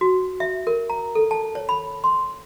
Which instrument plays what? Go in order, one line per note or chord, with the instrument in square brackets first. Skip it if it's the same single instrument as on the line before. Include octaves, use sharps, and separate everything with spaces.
[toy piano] F#4
E5
A#4
A#5
A4
A5
C#5
B5
C6